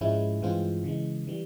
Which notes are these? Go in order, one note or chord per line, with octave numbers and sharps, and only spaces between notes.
G#2 F3 G#3 C#4 E4
G2 E3 G#3 C4 F4
C#3 E3 G#3
E3 G3